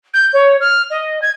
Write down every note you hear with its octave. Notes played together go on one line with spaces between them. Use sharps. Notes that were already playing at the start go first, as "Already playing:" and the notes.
G6
C#5
F6
D#5
G#6